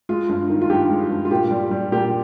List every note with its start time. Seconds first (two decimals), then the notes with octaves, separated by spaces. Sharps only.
0.09 G#3 F4
0.29 G2
0.50 D#3
0.62 F4
0.70 G2 G4
0.90 G#3
1.11 G2
1.25 F4
1.31 A#2 G4
1.51 G3
1.71 G3
1.92 A#2 G4